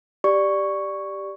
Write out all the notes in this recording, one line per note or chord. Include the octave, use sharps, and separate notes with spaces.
G4 D5 C#6